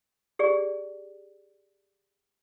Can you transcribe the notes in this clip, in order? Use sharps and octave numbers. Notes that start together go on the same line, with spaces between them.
G4 G#4 D5